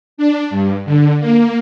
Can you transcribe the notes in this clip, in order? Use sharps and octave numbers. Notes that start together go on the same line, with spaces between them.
D4
G2
D3
A#3